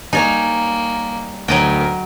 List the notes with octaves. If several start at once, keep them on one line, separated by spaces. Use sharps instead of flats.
G3 A#3 D#4 C#5 G#5
D2 F#3 A#4 D#5 G5